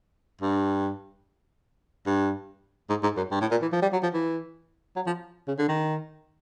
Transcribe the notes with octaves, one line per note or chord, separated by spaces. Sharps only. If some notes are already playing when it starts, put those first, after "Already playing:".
G2
G2
G#2
G#2
F#2
G2
A2
A#2
E3
F3
G3
F#3
F3
E3
F#3
F3
C#3
D3
D#3